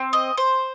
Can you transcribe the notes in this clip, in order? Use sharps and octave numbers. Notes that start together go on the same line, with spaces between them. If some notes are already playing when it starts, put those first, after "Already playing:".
Already playing: C4
D#5
C5